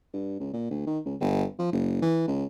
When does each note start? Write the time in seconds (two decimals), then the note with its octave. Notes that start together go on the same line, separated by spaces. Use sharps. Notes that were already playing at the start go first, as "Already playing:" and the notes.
0.13 G2
0.40 C#2
0.53 A#2
0.71 D2
0.87 D#3
1.05 C#2
1.21 G1
1.59 F3
1.73 F#1
2.02 E3
2.28 C#2